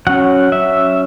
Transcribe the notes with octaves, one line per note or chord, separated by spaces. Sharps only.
F#3 C#4 F#5
E5